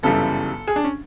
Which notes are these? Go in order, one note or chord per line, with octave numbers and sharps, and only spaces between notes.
G1 F#2 C#3 E3 G3 A4
G#4
D4
C#4